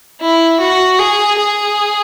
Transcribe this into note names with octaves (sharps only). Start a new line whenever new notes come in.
E4
F#4
G#4
G#4